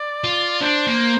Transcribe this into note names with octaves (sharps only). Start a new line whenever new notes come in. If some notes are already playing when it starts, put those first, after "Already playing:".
Already playing: D5
F4
D4 C5
A#3